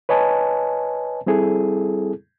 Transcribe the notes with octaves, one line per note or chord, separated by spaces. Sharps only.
B4 C#5 D#5 G#5 A5
G3 C4 E4 G#4 A4